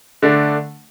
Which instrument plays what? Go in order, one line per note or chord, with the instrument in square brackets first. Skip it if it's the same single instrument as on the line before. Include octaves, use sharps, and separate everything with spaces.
[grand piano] D3 A3 D4